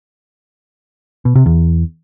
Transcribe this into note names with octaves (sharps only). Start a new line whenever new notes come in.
B2
C3
E2